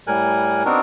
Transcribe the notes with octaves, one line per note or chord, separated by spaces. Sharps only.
A2 G3 A#4 G#5 F#6
B3 C4 D4 D#4 F#4 A#4